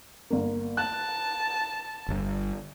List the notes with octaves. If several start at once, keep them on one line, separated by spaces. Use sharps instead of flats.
G1 A#3
A5 F#6
G1 G2